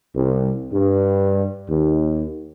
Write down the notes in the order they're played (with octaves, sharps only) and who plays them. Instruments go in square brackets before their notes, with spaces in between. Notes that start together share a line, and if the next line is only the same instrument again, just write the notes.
[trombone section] C2
G2
D#2